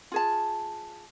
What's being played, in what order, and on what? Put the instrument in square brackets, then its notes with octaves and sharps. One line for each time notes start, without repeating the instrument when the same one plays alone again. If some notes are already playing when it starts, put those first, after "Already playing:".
[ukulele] F4 G#4 A5